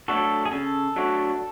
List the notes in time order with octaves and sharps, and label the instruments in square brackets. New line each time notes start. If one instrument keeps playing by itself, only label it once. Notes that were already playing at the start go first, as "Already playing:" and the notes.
[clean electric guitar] F#3 A3 D4 F#4 [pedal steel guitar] A4
[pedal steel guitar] G#4
[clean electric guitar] C#3 [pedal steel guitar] A4
[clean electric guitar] F#3 A3 D4 F#4